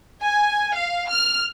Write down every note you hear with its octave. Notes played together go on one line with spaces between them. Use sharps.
G#5
F5
F6